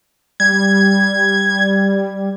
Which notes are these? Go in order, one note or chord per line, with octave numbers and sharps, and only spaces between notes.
G3 G#6